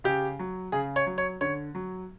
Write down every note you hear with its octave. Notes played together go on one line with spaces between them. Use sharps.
C#3 G4
F#3
C#3 G#4
C#5
F#3
C#5
D3 C#5
F#3